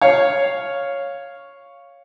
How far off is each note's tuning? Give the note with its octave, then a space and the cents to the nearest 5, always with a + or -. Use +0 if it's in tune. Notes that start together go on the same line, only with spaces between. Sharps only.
C#5 +0 F5 +0